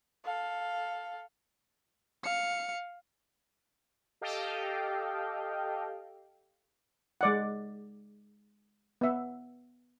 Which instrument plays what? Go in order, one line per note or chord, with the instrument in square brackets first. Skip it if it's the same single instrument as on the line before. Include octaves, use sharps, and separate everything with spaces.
[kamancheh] A4 F5
[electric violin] F5 C#7
[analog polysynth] G4 A4 D#5 F5 G5
[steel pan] G#3 D5 F#5
B3 E5